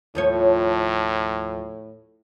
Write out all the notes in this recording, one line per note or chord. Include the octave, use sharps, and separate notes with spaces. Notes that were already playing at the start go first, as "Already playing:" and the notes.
D#2 A2 F3 C#5